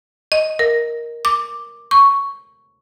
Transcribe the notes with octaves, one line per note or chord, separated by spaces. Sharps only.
D#5
A#4
D6
C#6